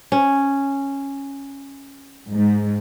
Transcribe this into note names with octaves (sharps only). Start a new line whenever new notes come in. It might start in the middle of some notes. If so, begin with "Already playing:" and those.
C#4
G#2